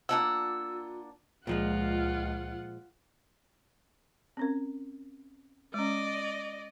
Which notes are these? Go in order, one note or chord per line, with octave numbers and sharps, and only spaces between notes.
A#3 D4 F4 F#5 E6
C#2 A#2 F3 G#3 F4 F#5
C4 C#4 A#4
G#3 C#4 D5 D#5